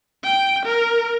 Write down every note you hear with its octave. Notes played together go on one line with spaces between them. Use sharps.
G5
A#4